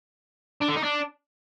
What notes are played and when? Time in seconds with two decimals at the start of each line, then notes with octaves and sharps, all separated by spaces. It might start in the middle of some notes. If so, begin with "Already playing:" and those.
0.62 D4
0.70 D3
0.77 D#4
0.84 D4